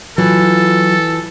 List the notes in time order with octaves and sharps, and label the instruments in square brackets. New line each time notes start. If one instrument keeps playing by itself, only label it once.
[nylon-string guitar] E3 [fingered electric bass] F#3 [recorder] F4 [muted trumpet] A4